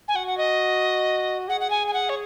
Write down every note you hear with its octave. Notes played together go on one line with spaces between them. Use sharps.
G#5
F#4 F#5
F#5
D#5
G#4 F#5
F#5
G#5
G#5
F#5
C#5